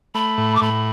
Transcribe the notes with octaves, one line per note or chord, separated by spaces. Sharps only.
A3 B5
A2
D6
A2 B5